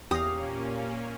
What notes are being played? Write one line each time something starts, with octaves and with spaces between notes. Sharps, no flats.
E2 A#2 A#3 C#4 G4 F5 D#6 A#6